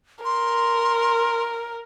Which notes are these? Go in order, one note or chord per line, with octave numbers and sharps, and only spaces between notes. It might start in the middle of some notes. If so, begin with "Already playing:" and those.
A#4 C6